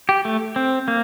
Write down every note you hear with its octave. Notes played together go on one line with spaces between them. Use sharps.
G4
A3
C4
A#3